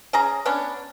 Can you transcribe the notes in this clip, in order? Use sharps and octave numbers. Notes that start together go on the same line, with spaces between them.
C#4 G#4 A#5
B3 C#4 D4